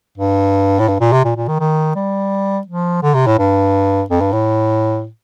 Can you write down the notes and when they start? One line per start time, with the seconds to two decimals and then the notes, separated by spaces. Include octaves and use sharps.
0.18 G2
0.80 A2
0.88 G2
1.00 A#2
1.13 C3
1.25 A#2
1.36 A#2
1.48 D#3
1.60 D#3
1.95 G3
2.67 F3
3.03 D3
3.14 C3
3.27 A2
3.39 G2
4.10 F2
4.21 G2
4.33 A2